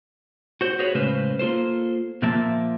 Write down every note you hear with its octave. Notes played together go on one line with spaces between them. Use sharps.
F#4 C5
F#4 G#4 B4 C#5
A2 C#3 G#3 C#4 B4 C5
A#3 F4 A4 C5
A#2 F3 A#3 E5 A5